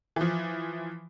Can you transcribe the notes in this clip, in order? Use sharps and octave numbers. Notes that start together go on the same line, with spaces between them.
E3 F3